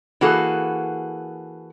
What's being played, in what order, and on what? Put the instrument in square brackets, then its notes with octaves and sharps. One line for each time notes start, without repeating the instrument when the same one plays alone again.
[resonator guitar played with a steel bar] E3 A#3 F#4 G#4 A4